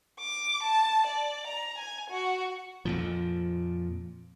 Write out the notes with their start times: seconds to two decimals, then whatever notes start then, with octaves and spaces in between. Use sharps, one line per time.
0.20 D6
0.63 A5
1.07 D5
1.47 A#5
1.79 G#5
2.10 F#4
2.85 F2 A#2 F3